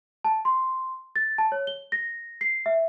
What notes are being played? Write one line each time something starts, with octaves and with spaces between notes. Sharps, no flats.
A5
C6
A6
A5
C#5
G7
A#6
C7
E5